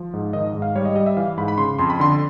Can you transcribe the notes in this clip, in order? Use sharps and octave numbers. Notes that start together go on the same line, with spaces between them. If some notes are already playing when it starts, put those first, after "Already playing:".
Already playing: F3
G#2
D#3 D#5
G#2
F5
G3 C#5
D#5
G3 D#5
E5
E3 F5
G#2 B5
B5
C#3 C6
F2 C6
B5
D3 C6